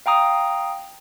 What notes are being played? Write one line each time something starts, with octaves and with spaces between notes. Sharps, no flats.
F5 G5 A#5 D#6